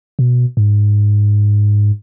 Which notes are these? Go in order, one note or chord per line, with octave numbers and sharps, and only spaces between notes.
B2
G#2